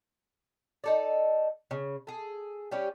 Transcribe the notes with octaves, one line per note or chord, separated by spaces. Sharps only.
D#4 A4 D5
C#3
G#4 A4
G3 C#4 G4